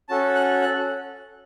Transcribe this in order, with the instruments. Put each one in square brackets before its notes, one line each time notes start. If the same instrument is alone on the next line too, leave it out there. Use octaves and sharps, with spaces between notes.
[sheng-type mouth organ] C#4 F#4 A4 A5
F#6
F#6